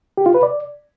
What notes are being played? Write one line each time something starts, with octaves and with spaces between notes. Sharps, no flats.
G4
F4
B4
D5